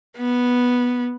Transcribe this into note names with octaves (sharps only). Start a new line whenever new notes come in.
B3